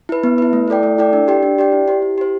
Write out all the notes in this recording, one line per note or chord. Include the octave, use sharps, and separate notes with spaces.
E4 B4
B3
E4 B4
A3
E4 A4 D5 G5
A3
E4 A4 D5 G5
D4
G4 D5 G5
D4
G4 D5 G5
E4
G4 C5
E4
G4 C5